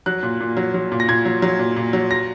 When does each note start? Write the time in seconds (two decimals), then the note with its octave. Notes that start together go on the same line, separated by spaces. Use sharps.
0.06 F#3 F#6
0.23 A#2
0.41 A#2
0.57 F#3
0.74 F#3
0.92 A#2
1.00 A#6
1.08 A#2 G#6
1.25 F#3
1.42 F#3
1.59 A#2
1.76 A#2
1.93 F#3
2.11 A#6